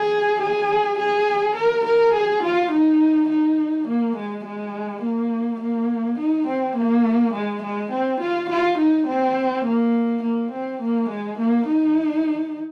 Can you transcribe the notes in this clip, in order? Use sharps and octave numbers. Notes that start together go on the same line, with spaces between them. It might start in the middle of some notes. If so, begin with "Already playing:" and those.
Already playing: G#4
G#4
G#4
A#4
A#4
G#4
F4
D#4
D#4
A#3
G#3
G#3
A#3
A#3
D#4
C4
A#3
G#3
G#3
C4
F4
F4
D#4
C4
A#3
A#3
C4
A#3
G#3
A#3
D#4